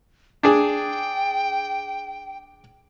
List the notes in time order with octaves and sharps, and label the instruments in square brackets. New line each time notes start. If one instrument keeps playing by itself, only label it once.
[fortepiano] D4 G#4 [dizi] G5